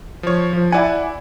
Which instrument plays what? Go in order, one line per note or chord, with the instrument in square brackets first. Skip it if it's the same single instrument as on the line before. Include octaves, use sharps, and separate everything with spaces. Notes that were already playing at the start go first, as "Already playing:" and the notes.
[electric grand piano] F3 C#5
F3
[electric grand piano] E4 F#5 [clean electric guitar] D5 G#5